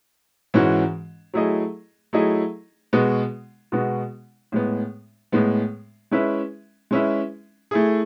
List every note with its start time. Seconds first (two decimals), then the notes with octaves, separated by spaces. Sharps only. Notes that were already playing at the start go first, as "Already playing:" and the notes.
0.54 G#2 E3 G#3 C#4 F#4
1.34 F#3 A3 E4 G#4 D#5
2.13 F#3 A3 E4 G#4 D#5
2.93 B2 G#3 B3 F#4
3.72 B2 G#3 B3 F#4
4.52 A2 G#3 B3
5.32 A2 G#3 B3
6.12 G#3 C#4 E4 B4 E5
6.91 G#3 C#4 E4 B4 E5
7.71 A3 E4 G#4